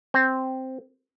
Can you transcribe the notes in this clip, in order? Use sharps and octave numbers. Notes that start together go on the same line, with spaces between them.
C4